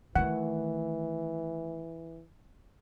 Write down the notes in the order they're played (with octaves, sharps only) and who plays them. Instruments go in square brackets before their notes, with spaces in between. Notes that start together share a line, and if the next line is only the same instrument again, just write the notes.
[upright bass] D#3 A3 [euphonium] E3 [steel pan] F#5